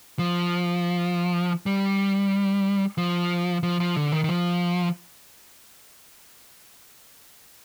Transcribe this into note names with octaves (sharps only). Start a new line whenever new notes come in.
F3
G3
F3
F3
F3
D3
D#3
D#3
F3